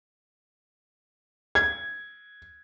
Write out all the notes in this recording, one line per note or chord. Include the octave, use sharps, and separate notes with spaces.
G#6